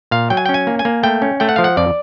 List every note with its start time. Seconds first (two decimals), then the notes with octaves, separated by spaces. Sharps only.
0.11 A#2 F5
0.30 F#3 G5
0.37 G#5
0.46 C#4 G5
0.54 G#5
0.67 A#3
0.79 G#5
0.85 A#3
1.03 A3 G5
1.22 C#4
1.40 A3 G5
1.49 F#5
1.56 F3 F5
1.64 F#5
1.77 F2 D5